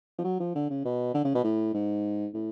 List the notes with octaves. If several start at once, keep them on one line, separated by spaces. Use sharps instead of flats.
F3
F#3
F3
D3
C#3
B2
D3
C#3
B2
A2
G#2
A2